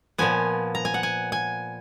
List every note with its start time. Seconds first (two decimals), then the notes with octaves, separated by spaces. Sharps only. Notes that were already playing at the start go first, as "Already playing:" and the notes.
0.18 A#2 F3 B3 G#5
0.75 A#5
0.85 G#5
0.94 F#5
1.03 G#5
1.32 G#5